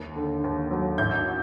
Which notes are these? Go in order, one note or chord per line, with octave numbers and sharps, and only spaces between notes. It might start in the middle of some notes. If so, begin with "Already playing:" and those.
Already playing: D#2
D3
D#2
F#3
A1 G6